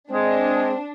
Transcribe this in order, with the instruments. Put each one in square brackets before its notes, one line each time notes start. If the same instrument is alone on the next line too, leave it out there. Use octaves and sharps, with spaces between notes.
[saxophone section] G#3 [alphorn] C4 [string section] D4